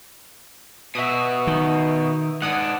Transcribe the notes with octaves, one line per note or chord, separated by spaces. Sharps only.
B2 F#4 E5 D#6
D#3
G#2 D4 F#5 D#6